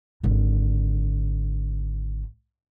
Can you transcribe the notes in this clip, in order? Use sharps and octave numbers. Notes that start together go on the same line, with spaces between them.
G#1 D3